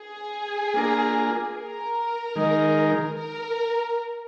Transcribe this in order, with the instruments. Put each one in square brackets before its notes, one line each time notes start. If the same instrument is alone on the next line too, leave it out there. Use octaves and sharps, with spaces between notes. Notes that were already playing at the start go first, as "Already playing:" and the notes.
Already playing: [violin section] G#4
[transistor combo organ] A#3 D4 F4 A#4
[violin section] A#4
[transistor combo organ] D#3 G#3 D#4
[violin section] A#4